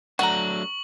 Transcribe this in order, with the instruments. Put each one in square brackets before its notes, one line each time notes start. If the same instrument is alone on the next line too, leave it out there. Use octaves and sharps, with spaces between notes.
[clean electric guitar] F#3 A3 D4 [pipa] F#5 A#5 [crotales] C#6 F#7